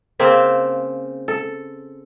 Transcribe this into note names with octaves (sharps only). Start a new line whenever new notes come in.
C#3 A#3 C4 E5
A4